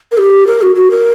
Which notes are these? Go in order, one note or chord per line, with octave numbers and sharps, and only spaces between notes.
A#4
G4
A#4
F#4
F#4
A#4